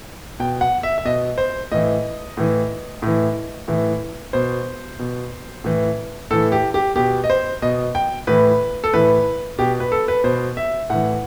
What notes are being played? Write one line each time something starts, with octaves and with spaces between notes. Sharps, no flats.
B2 G5
F#5
E5
E5
B2 D#5
C5
A2 E3 D#5
A2 E3
A2 E3
A2 E3
B2 C5
B2
A2 E3
A2 E3 A4
G4
G4
B2 G4
D#5
C5
B2 D#5
G5
A2 E3 B4
A4
A2 E3 B4
B2 G4
B4
A4
B4
B2 C5
E5
A2 E3 F#5